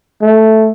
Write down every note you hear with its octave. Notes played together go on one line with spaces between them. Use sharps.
A3